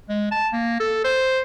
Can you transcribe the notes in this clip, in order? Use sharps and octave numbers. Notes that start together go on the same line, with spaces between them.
G#3
A5
A#3
A4
C5